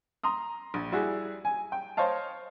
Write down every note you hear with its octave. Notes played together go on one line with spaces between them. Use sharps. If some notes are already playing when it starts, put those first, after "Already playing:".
A#5 C6 D#6
A#1
G3 E4 F#4 G#4
G#5
G5
C5 C#5 D#5 F5 A5